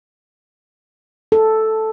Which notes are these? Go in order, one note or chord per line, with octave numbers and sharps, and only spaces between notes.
A4